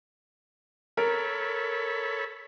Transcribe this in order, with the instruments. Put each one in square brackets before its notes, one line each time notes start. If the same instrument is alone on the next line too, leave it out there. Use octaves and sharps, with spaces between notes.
[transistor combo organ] A4 C#5 B5 [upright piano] A#4